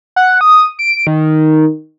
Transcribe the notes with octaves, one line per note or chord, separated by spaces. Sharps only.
F#5
D#6
D7
D#3